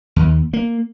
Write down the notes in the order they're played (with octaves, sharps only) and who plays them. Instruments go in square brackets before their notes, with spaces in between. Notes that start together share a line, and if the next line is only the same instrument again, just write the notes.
[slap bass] D#2
A#3